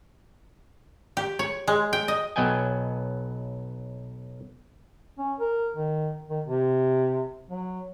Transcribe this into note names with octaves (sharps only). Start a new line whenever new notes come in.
G4
C#5
G#3
G5
D#5
B1 F#3 B3 D#5 G5 G#5
C#4
A#4
D#3
D#3
C3
F#3